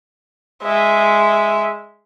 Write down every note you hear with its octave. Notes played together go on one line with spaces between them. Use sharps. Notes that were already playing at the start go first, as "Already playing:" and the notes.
G#3 E5